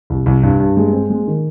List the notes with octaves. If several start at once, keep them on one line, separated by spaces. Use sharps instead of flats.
C2
C2
G2
G2
G#3
C4
G#3
D#3